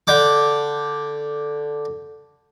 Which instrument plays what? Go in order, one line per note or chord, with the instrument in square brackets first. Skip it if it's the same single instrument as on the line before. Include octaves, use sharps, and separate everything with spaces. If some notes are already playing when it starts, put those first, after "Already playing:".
[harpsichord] D3 G5 D6